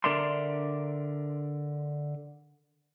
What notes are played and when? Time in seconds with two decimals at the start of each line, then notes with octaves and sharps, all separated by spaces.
0.04 D3 D4 A#4 D5 E5 C6